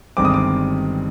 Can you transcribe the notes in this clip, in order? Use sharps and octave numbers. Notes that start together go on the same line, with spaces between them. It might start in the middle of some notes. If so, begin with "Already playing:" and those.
G1 G2 D#3 G#3 C4 D6
D#6
D6